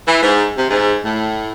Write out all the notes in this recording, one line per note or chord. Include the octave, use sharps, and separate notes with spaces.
E3
G#2
C3
G#2
A2